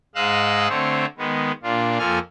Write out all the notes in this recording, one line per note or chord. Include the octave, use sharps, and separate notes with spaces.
G#2 G#3 D#5 F5 E6 F#6
D3 A3 C4 C5 C#5
D#3 G#3 B3
A#2 D4 F4
F2 F3 A#3 A4 G#5 F6